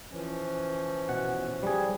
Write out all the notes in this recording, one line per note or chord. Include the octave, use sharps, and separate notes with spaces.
E3 F3 C#4
B2 F#5
G3 G#4